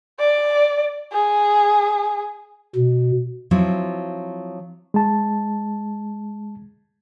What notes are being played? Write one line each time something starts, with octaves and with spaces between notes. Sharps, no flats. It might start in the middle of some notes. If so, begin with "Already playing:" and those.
D5
G#4
B2
F3 F#3 C4 E4
G#3 A5